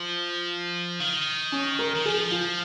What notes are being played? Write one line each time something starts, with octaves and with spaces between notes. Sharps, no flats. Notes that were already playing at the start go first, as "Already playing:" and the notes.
Already playing: F3
D#3
C#4
A#4
D#3
F3 G#4
F4